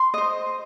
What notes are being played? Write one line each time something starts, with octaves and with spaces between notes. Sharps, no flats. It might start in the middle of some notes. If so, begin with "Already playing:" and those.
Already playing: C6
C5 D#5